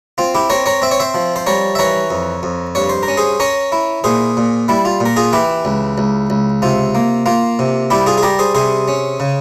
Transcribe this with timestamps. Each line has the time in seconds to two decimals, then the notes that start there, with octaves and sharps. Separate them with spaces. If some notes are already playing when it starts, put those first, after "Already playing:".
0.18 C4 F4
0.35 E4 G4
0.50 C4 A#4 C#5
0.66 A#4 C#5
0.82 C4 E5
0.91 C#5
1.00 C5 E5
1.14 F3
1.36 C5
1.47 G3 A#4 C#5
1.75 E5
1.79 E3 A#4 C#5
2.11 F2
2.43 F2
2.75 G2 C#5
2.89 C5
3.03 A#4
3.08 C#4
3.17 G#4 C5
3.40 C#4 A#4 C#5
3.72 E4
4.04 A#2 G#4 C5
4.37 A#2
4.68 G3 E4
4.85 F4
5.01 A#2
5.06 A#4
5.16 F4 G#4
5.33 E3 E4 G4
5.65 C#2
5.98 C#2
6.30 C#2
6.62 C3 F4
6.95 A#3
7.26 A#3 F4
7.59 C3
7.90 G3 E4 G4
8.07 F4 G#4
8.18 G#4
8.23 G3 G4 A#4
8.39 G#4 C5
8.55 C3 G#4 C5
8.88 C#4
9.20 C#3